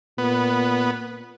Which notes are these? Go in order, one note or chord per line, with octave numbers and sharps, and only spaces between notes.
A#2 B3